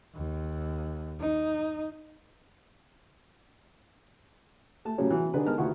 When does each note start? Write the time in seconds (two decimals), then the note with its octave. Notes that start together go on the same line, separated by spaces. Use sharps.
0.15 D#2
1.20 D#4
4.85 A3 A5
4.98 A2 C#3 F#3 G3 C#4
5.11 E3 F#4
5.34 D3 D4 D#4 G4 G#4 B4
5.46 G#3 B3 D#4 A#4 A5 F6
5.58 D2 D#3 E4 F4 F#5 C#6